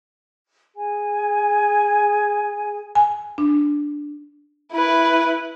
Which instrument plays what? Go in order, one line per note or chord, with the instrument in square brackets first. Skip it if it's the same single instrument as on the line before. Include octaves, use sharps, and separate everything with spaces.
[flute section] G#4 G#5
[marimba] G#5
D4
[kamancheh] E4 B4